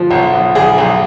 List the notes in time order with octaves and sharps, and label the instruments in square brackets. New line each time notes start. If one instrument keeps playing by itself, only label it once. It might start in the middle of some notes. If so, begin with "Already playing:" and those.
Already playing: [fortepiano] F3
B1
B1
B1 G#4
B1